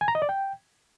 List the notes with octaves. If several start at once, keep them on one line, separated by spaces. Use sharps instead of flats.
G#5
A#5
D#5
D5
G5